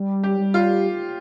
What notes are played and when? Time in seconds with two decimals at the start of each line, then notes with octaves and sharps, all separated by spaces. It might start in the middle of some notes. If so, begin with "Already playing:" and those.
Already playing: G3
0.23 G4
0.39 G3
0.54 F4